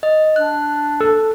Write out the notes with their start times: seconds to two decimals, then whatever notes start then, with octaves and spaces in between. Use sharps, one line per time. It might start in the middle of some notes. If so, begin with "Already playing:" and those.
0.03 D#5
0.36 D4 F#6
1.01 A4